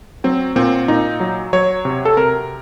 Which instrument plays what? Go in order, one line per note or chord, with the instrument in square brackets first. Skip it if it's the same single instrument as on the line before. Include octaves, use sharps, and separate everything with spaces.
[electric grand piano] F#3 C4
A#2 C4
A#2 D#4
F#3
F#3 C#5
C3
A4
C3 A#4